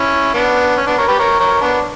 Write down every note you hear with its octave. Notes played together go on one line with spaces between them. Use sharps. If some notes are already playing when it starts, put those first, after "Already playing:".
Already playing: C#4 E4
B3 D4
C#4
B3 D4
A#4 C#5
G4 B4
A#4 C#5
A#4 C#5
B3 D4